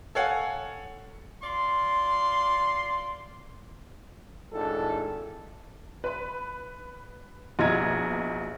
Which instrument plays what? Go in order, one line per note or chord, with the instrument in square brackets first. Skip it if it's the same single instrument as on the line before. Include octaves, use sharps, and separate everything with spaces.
[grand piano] A4 C#5 F5 F#5 G#5
[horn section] F4 D5 C6
[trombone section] G#1 A2 D4 A4
[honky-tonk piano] B4 B5
A#1 B2 E4 D#5 A#5 G#6